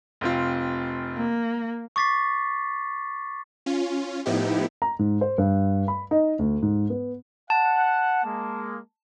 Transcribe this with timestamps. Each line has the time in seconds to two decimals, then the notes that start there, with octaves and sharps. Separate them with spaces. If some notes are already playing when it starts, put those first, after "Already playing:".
0.21 F1 C4 F4
1.15 A#3
1.96 C#6 D6 A6 B6 C7
3.66 C#4 F4
4.26 A2 F3 B3 D#4 E4 G4
4.82 A#5
4.99 G#2
5.21 C5
5.38 G2
5.88 B5
6.11 D#4
6.39 D2
6.62 G#2
6.90 B3
7.50 F#5 A5
8.24 G#3 A#3